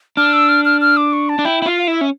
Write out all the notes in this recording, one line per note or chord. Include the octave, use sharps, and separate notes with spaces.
D4 F6
E6
F6
F6
F6
D6
C#6
A5
D4
E4 G5
E4
F4 F5
F5
E4 E5
C#4